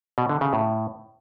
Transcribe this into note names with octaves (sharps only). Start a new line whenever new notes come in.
B2
D3
C#3
A2